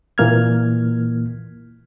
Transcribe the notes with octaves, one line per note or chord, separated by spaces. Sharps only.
A#2 E3 A#3 F6 G#6